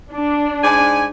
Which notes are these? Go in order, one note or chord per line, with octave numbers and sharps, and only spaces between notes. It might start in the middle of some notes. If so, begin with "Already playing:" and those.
D4
G#2 D5 G#5